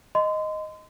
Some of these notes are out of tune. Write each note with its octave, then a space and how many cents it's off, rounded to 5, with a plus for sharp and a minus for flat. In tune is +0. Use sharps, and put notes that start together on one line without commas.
D#5 +0 C6 -30